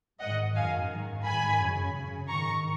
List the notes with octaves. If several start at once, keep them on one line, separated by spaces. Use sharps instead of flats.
G#2 D#3 D#5 F#5
F#2 D#3 F5 G#5
G#2 D#3
G#2 D#3 G#5 B5
F#2 C#3
F#2 C#3
G#2 D#3 A#5 C#6